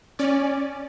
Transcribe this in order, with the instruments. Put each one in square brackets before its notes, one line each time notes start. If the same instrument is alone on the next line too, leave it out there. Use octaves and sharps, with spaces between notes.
[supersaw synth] C#4 D5